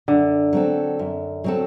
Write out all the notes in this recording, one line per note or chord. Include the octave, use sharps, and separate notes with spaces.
F#2 D3
F#3 C4 F#4 A4
F#2
F#3 C4 F#4 A4